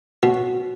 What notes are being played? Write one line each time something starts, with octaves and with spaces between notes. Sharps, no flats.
B2 F#4